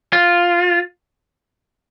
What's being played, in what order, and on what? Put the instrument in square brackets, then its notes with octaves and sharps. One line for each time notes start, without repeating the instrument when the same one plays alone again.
[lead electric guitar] F4